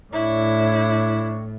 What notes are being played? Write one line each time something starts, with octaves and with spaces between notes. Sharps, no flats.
A2 D4 E4 C#5